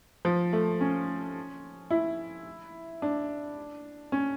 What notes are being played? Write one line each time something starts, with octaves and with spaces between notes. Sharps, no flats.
F3
A3
C#4
E4
D4
C#4